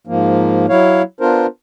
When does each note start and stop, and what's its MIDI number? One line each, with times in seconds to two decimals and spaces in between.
0.07 0.66 44
0.07 0.66 53
0.07 0.66 58
0.69 1.02 54
0.69 1.02 64
0.69 1.02 73
0.69 1.02 77
1.21 1.46 59
1.21 1.46 62
1.21 1.46 65
1.21 1.46 70
1.21 1.46 72